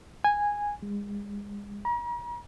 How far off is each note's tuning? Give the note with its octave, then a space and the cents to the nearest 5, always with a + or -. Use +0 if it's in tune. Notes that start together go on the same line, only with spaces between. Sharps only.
G#5 -10
G#3 -35
A#5 +40